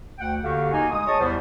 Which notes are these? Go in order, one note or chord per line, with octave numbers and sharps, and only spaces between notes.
D2 F#5 G5
D#2 D3 F#4 G4 F5 F#5
A#3 D#4 F#4 G#5
G#3 D#6
G#4 C#5 D#5 A5 C#6 D#6
E2 C3 G3 B3 E4 C5